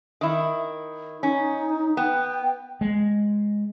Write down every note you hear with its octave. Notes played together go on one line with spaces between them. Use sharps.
D#3 E4
C#4 D#4
B3 G5
G#3